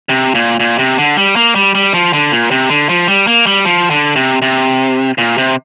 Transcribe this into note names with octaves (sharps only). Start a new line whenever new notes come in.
C3
A#2
A#2
C3
D3
G3
A#3
G3
G3
F3
D3
A#2
C3
D3
F3
G3
A#3
G3
F3
D3
C3
C3
A#2
C3